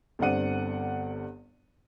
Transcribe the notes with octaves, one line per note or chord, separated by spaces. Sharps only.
G1 G2 C4 D5 F#5 D#7